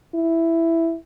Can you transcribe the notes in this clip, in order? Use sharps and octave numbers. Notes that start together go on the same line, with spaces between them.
E4